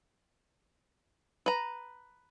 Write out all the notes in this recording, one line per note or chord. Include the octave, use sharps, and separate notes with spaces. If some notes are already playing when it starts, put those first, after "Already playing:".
B4 A#5